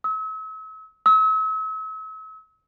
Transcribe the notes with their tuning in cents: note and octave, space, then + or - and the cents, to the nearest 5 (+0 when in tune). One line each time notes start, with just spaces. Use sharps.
E6 -40
E6 -40